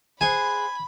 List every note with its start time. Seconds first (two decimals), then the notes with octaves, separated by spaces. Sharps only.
0.21 G#4 C5 F#5 G#5 B5